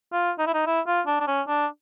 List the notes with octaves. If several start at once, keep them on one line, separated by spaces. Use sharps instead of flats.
F4
D#4
E4
D#4
E4
F4
D4
D4
C#4
D4